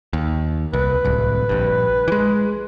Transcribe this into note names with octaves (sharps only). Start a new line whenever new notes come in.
D#2
C2 B4
D1 C2
A#1 G2
E3 G#3